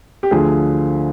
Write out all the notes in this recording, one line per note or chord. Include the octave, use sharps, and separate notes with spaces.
G4
D2 D3 F3 G#4